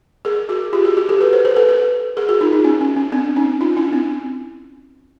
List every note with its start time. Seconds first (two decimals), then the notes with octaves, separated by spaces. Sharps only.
0.25 G#4 A#4
0.49 F#4 G#4
0.73 F4 G4
0.85 F#4 G#4
0.97 F#4 G#4
1.09 G4 A4
1.21 A4 B4
1.33 A#4 C5
1.45 A4 B4
1.56 A4 B4
1.69 A4 B4
2.17 G#4 A#4
2.29 F#4 G#4
2.41 D#4 F4
2.53 D#4 F4
2.64 C#4 D#4
2.81 C#4
2.96 C#4
3.12 C4 D4
3.36 C#4 D#4
3.61 D#4 F4
3.77 D4 E4
3.93 C4 D4